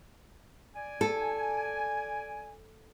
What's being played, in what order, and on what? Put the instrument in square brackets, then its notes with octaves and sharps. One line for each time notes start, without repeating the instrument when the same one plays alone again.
[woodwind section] D5 G#5
[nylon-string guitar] A4